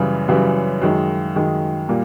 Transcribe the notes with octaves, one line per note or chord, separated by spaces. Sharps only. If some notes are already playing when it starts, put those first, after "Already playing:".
Already playing: F#2 C#3 E3 G3
F#2 C#3 E3 G3
F#2 D#3 G#3
F#2 D#3 G#3
A#2 G3 A#3